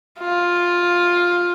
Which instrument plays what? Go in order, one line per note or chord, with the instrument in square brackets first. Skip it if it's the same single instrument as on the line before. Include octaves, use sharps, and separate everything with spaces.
[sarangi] F4